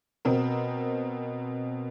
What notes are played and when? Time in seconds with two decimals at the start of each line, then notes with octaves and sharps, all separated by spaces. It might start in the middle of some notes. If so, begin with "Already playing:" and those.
0.25 B2 C4 A#4